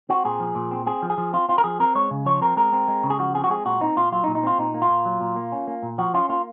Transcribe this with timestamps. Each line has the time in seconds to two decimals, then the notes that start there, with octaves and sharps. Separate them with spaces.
0.09 C4 F#4
0.25 A#2 G#4
0.40 F3
0.55 A#2
0.71 C4
0.86 C4 G#4
1.02 F3
1.10 G#4
1.18 F3
1.33 C4 F4
1.49 C4 F4
1.58 A#4
1.64 F3 G#4
1.80 C4 A#4
1.95 G#3 C#5
2.11 C#3
2.26 F3 C#5
2.42 C4 A#4
2.57 G#3 A#4
2.73 C4
2.88 G#3
3.03 C#3
3.10 G#4
3.19 F3 F#4
3.34 C4 G#4
3.44 F#4
3.50 G#3 G#4
3.65 A#2 F#4
3.81 C4 D#4
3.96 A#2 F4
4.12 F#3 F4
4.24 D#4
4.28 A#2
4.35 D#4
4.43 C4 F4
4.58 A#2 D#4
4.74 A#3
4.82 F4
4.90 A#2
5.05 F#3
5.21 A#2
5.36 A#3
5.52 C#4
5.67 A#3
5.83 A#2
5.98 F3 F#4
6.14 C#4 F4
6.29 A#3 F4